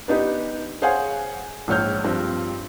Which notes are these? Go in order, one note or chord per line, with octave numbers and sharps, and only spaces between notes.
B3 D4 D#4 G4
G#4 C5 C#5 F5 F#5 G#5
A#1 G#2 C#5 F6 G6
G2 F3 C4